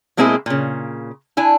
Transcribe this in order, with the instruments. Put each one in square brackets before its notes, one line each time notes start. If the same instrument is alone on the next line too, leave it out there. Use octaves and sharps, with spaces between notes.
[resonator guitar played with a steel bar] B2 G#3 A#3 C4 E4 G#4
A#2 C#3
D4 E4 G#5